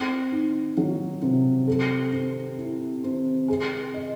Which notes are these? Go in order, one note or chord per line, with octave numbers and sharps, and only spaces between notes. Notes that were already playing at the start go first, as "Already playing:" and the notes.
Already playing: C4
D#4
F#3
C3
A4
C4
E4
C4
G#4
D#5